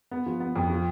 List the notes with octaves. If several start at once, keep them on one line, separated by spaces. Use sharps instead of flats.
B3
F3
B3
F2
F3